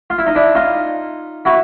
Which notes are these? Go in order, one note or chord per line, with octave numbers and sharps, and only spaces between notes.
F4
E4
D#4
D4 E4
D#4 F4
E4 F#4